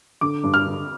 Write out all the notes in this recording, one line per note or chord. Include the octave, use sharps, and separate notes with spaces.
D3 D6
G2
F6
D3